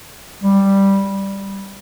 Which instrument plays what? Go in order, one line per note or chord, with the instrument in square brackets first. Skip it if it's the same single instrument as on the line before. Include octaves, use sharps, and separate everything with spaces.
[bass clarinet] G3